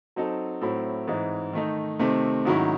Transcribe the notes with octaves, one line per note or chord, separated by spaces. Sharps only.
F#3 C4 D#4 A4
A2 F#3 C4 E4
G#2 E3 C4 D#4
D#3 A3 D#4
C3 D#3 A3 C4
G#2 D#3 F#3 C#4 E4